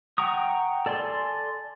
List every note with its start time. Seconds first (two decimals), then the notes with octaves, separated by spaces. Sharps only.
0.18 F#5 G5 A#5 C#6 D#6
0.86 A4 D5 G#5 C6